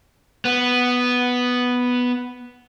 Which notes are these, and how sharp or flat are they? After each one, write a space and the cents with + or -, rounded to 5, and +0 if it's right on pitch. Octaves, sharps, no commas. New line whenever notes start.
B3 +0